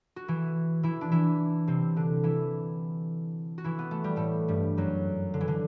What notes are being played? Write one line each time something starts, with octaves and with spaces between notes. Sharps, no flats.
F#4
E3 E4
E3 E4
D4
E3 E4
C3 C4
D3 D4
E3 E4
F#4
E3 E4
B3
A3
G3
A2 A3
G2 G3
F#2 F#3
D3
E3
D3